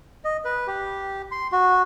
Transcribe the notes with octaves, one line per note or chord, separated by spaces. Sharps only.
D#5
B4
G4
C6
F#4